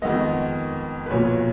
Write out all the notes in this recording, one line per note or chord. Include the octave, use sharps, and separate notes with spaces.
F2 D#3 G#3 B3 D#5
B4
B1 A#2 F3 C#5